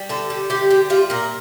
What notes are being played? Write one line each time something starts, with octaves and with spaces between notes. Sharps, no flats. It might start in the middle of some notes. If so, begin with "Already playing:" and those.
Already playing: G3
D3 A4
G3
D3 G4
G3
G3 F4
A#2 A#4